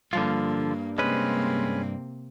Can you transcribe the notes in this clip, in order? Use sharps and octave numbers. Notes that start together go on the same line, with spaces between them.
G2 D3 F3 A#3 F4
C3 G#3 A#3 C4 C#4 B4